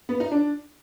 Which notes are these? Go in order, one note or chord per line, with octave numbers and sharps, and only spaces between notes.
B3
D#4
D4